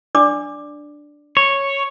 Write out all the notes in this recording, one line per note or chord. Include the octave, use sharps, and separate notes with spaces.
D4 D5 D6
C#5